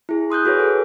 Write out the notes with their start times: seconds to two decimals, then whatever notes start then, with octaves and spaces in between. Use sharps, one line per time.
0.09 E4 G#4
0.30 C6 D#6 F#6 G6
0.45 F#4 G#4 B4 C#5
0.60 A4